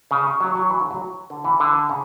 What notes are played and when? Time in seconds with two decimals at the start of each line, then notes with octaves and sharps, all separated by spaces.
0.11 C#3
0.40 F#3
0.55 F#3
0.70 E3
0.80 D3
0.91 F#3
1.30 D3
1.45 E3
1.60 D3
1.89 C#3